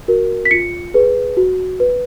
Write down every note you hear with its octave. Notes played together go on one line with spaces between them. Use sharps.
F#4 A#4
B6
F4 C#7
G#4 B4
F#4
B4